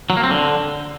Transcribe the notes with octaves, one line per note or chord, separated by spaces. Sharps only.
F#3
A#3
C4
D3